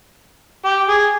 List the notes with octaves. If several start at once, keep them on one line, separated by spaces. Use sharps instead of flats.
G4
G#4